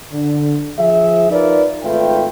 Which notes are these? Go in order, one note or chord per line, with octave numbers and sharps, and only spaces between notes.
D3
F3 G#4 E5
D#4 F4 A#4 B4 D5
G#1 A3 F4 B4 E5 G5